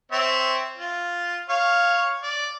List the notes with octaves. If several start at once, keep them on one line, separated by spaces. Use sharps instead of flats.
C4 C#5 E5
F4
C#5 F5
D5